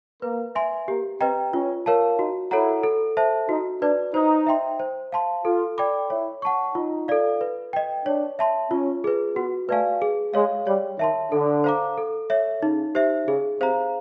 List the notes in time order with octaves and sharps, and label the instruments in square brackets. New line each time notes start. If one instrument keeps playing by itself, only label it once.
[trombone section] A#3 [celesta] B4
[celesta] E5 G#5 C6
[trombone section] A#3 [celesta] G4
[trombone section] C4 [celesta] B4 D#5 G5 A#5
[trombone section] C#4 [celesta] F4
[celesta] A#4 C#5 F5 A5
[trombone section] D#4 [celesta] F#4
[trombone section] E4 [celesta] A4 C#5 F#5 A#5
[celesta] A4
C5 E5 A5
[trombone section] D#4 [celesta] F#4
[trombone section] D4 [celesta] B4 D5
[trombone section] D#4 [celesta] C5
[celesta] E5 G5 C6
C5
F5 A5 C6
[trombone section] F4 [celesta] A4
[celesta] D5 G5 B5 D6
[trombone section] E4 [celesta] C#5
[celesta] F#5 A5 C#6
[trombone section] D#4 [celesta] F4
[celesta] A4 D5 F5
B4
D#5 G5
[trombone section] D4 [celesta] C#5
[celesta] E5 A5 C6
[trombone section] C#4 [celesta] F4
[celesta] G#4 B4
[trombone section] B3 [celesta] F#4
[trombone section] A3 [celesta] B4 D5 F5 G#5
[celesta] G#4
[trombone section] G#3 [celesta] C#5 F5
[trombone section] G3 [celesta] C#5
[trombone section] D#3 [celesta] E5 A5 C6
[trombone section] D3 [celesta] A4
[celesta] C5 F5 A#5 D6
A4
C#5 E5
[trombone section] C#3 [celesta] D#4
[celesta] G4 C5 E5
[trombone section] C#3 [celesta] G#4
[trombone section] C3 [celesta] C5 F5 A#5